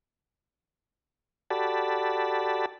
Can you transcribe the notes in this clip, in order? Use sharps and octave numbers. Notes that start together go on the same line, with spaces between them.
F#4 G4 A4 D5 A5 B5